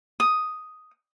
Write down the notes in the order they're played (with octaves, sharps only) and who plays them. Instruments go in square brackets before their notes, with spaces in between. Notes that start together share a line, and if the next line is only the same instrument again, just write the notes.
[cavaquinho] D#6